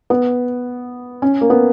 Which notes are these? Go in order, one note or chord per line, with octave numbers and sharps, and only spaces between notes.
B3
C#4
A#3
B3